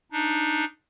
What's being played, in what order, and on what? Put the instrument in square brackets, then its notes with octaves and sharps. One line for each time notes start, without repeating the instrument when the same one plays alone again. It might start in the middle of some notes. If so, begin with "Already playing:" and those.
[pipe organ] D4 D#4